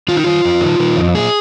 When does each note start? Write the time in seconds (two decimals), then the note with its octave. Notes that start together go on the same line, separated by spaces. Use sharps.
0.08 D#3 F4
0.17 D#4
0.24 D#3 F4
0.44 F2
0.61 D#3
0.80 D#3
0.97 F2
1.15 A#2 G#4